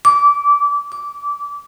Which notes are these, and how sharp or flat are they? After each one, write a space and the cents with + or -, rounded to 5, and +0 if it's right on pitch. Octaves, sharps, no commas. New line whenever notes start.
D6 -20
D6 -20